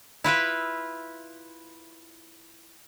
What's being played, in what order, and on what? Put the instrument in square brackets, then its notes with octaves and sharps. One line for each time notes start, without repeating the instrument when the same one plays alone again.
[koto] E4 F4 B4 E5